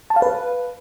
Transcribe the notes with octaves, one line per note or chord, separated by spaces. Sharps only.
A5
F5
B4